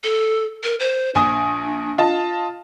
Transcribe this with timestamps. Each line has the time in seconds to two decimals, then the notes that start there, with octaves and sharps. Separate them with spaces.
0.04 A4
0.64 A#4
0.80 C5
1.15 A#1 D4 G#5 D#6
1.98 F4 D#5 A5